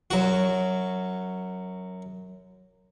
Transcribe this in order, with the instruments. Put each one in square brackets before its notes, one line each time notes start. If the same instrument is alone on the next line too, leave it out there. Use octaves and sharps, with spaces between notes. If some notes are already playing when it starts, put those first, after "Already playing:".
[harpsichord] F#2 F#4